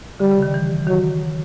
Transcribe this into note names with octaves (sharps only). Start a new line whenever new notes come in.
D3 G3
C#3
D#3
E3
D#3 F#3